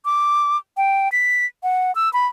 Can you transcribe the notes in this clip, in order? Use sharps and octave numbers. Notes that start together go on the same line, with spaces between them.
D6
G5
B6
F#5
E6
B5